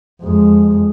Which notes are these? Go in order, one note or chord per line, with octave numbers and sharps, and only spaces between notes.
F2 G#3